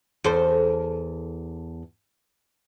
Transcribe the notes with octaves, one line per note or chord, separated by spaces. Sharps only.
E2 A4 C5